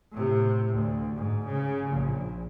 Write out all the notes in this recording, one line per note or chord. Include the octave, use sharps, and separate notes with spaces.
A2 C3
D2
G#2
C#3
A#1